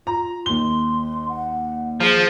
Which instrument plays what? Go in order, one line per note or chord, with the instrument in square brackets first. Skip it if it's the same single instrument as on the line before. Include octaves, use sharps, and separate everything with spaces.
[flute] F4 [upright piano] A#5
[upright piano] D#2 G7 [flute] C6
[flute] F#5
[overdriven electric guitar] F3 [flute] G#4